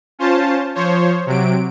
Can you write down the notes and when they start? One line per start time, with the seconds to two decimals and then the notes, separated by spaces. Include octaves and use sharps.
0.19 C#4 F4 C5 A5
0.75 F3 C5 C#5
1.26 C3 F#3 D7